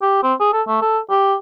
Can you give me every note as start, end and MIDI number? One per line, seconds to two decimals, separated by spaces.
0.02 0.21 67
0.23 0.33 60
0.40 0.52 68
0.53 0.62 69
0.67 0.78 57
0.81 0.99 69
1.10 1.35 67